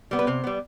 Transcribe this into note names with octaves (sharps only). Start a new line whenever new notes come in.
G3 B3
B4
C3 C5
G3 B3